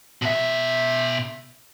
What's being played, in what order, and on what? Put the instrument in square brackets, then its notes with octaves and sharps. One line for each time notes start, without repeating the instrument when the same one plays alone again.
[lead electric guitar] B2 E5